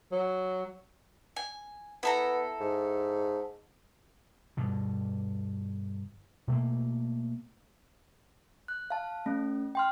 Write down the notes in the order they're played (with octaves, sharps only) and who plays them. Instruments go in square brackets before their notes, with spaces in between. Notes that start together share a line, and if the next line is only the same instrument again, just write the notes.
[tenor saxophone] F#3
[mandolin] G#5
[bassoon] B3 [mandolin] E4 A4 A#5
[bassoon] G#2
[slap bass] G2 B2 D3
B2 A3 A#3
[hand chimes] F#6
F5 A5
A3 C#4
G5 C6 F6